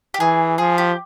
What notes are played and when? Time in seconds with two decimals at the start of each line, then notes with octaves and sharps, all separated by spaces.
0.14 G4
0.20 E3 G#4
0.58 F3 G#4
0.78 G4